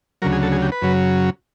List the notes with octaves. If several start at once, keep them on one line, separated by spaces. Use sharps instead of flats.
D2 C#3 F#3 A#4
G#4
A4
G#4
G4
B4
F#2 C#3 F#3